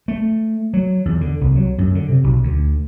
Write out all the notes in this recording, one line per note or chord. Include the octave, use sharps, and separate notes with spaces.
A3
F#3
E2
D3
C2
F#3
F#2
D3
C3
B1
D2